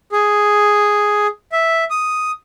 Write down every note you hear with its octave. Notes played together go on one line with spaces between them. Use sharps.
G#4
E5
D#6